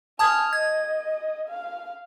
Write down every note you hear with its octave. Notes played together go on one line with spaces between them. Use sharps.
G#5 A5 D#6 F6 G#6
D#5 G#6
F5